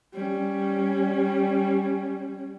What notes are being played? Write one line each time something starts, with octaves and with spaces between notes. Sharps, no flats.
G3 C#4